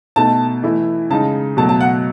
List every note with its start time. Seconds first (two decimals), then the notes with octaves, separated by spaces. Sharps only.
0.16 B2 A3 D#4 A5
0.63 E3 A3 E4
1.10 C#3 G#3 D#4 A5
1.57 B2 F#3 A3 A5
1.69 A5
1.80 F#5